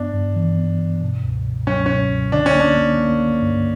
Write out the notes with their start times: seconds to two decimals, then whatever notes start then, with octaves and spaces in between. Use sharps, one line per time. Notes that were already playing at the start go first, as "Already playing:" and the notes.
Already playing: G2 B3 D4
0.14 G2
0.36 E3
0.58 B3
0.79 G2
1.01 B2
1.23 C#2
1.45 C#2
1.67 F#3 C#4
1.86 B2 C#4
2.11 C#2
2.32 D3 D4
2.46 C#4
2.55 A#3
2.60 D4
2.76 A#3
2.98 A#3
3.20 A#3
3.42 G2